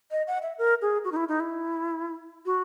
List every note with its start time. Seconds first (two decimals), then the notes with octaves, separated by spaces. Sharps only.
0.11 D#5
0.27 F#5
0.42 E5
0.58 A#4
0.82 G#4
1.05 F#4
1.12 D#4
1.16 E4
1.29 D#4
1.40 E4
2.46 F#4